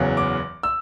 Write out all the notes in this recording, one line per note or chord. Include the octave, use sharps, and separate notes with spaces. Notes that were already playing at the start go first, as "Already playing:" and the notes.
Already playing: F#1 E2 C#3 F#3 B3
D6
E6